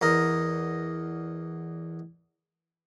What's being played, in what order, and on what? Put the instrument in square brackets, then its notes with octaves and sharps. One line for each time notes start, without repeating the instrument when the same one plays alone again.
[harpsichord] E2 A#4 D#5